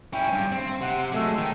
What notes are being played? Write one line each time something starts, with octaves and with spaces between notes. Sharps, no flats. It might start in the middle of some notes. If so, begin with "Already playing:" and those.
C#4 E4 G5
G2
C4
C3 F#5
F#3 G#3 A3
D#3 G5